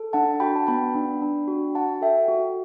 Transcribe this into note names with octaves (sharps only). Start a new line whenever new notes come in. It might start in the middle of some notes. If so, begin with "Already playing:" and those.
Already playing: A4
D4 F#5 A5
F#4 G5 B5
A5
B3 G5 B5
D4
D4
F#4
F#4 F#5 A5
A4 E5 G5
F#4